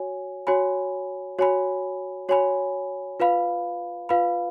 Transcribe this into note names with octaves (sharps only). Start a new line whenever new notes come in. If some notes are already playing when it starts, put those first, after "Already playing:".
Already playing: F#4 C#5 G#5
F#4 C#5 G#5 B5
F#4 C#5 G#5 B5
F#4 C#5 G#5 B5
F4 B4 F5 B5
F4 B4 F5 B5